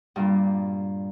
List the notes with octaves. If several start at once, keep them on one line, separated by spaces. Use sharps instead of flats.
G2 A#2 G3